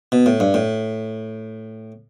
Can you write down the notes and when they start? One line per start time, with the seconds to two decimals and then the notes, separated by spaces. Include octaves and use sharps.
0.12 B2
0.26 A2
0.40 G2
0.54 A2